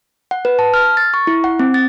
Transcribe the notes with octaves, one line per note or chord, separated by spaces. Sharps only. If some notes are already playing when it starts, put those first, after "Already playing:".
F#5
B4
A5
F6
A6
C#6
E4
F#5
C4
A6